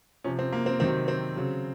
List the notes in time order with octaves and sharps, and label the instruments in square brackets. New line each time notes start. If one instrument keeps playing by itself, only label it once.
[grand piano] C3 F3 C#4
C4
A#3
C4
C3 D#3 F#3 C4
C4
C#3 F#3